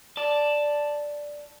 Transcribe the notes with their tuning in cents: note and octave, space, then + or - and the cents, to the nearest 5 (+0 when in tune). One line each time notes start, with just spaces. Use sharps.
D5 +0 A5 +0